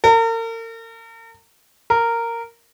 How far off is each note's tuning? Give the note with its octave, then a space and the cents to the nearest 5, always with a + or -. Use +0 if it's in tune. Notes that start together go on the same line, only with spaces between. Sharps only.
A#4 -40
A#4 -10